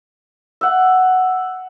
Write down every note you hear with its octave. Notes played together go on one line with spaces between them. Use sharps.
E5 F#5